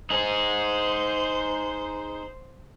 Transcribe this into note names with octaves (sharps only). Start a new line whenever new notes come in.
D#4 G#4 C5